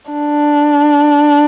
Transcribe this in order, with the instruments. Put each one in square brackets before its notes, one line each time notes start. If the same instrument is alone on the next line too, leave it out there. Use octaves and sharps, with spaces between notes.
[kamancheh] D4